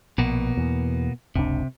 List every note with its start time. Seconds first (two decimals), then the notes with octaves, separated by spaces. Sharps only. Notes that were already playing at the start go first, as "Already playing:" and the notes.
0.18 A#1 B2 A#3 B3
0.57 E2
1.35 F#1 C#2 C3 D4